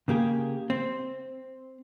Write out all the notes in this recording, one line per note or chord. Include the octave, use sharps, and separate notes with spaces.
C#3 A#3 G4 G#4
C4